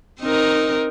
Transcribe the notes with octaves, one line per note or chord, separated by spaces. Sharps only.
C4 D#4 A#4